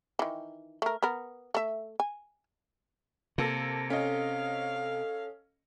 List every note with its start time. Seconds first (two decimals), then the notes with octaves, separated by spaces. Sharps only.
0.19 D#3 E3
0.82 A3 A#4
1.03 B3 A#4
1.55 A3 E5
2.00 G#5
3.38 C3 A#3 A4 A#6
3.90 C#4 A4 D#5 F5